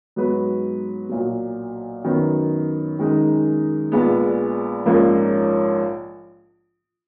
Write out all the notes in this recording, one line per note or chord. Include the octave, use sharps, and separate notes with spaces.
G#2 F#3 B3 F#4 B4
B1 A#2 F#3
F#2 D#3 F#3 B3
F#2 D#3 G#3 D#4
A#1 A#2 G#3 B3
A#1 G#2 F3 A#3 C#4